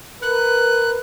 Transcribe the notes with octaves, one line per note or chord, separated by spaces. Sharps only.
A#4 B4 F#6